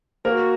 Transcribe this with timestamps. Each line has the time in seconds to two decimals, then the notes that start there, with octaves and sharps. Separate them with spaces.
0.24 A#3 F#4 G#4 A#4